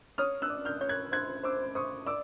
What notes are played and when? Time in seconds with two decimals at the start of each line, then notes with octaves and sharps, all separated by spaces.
0.18 C#5 D#6 F6
0.42 E6 F#6
0.50 D5
0.65 F6 G6
0.81 C#5 G6
0.89 F#6 G#6
1.12 C5 F#6 G#6
1.43 C5 D6 E6
1.75 C5 C#6 D#6
2.06 D5 D6 E6